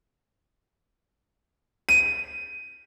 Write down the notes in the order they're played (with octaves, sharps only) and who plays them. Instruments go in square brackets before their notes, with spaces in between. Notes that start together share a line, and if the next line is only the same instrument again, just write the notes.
[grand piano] D#7